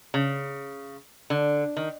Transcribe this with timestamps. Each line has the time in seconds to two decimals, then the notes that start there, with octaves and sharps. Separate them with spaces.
0.14 C#3
1.30 D3
1.77 D#3